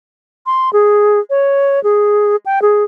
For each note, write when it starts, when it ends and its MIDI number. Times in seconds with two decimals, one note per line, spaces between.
0.46 0.72 84
0.73 1.19 68
1.30 1.82 73
1.83 2.36 68
2.46 2.62 79
2.62 2.84 68